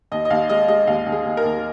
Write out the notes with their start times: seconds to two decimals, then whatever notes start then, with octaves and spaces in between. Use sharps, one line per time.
0.12 D#2 D#5
0.25 D#5
0.30 D#2 F5
0.49 G#3 D#5
0.68 G#3 D#5
0.87 D#2 F5
1.06 D#2
1.12 G#4
1.25 D#2
1.37 A#4
1.44 D#2